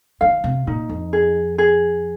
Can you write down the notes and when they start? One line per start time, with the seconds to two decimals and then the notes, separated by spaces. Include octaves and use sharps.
0.21 D#3 F5
0.44 C3
0.67 A#2 D#4
0.89 F2
1.13 G#4
1.58 G#4